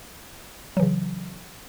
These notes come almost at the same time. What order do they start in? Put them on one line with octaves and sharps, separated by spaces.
F#3 E3 C#3